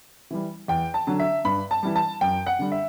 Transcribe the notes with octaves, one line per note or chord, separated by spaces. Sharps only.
E3 G3
E2 G5
A5
D3 F#3
E5
G2 B5
A5
E3 G3
A5
F#2 G5
F#5
D3 G3
E5